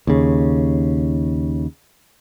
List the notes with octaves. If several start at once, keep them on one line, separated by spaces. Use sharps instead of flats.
D#2 C#3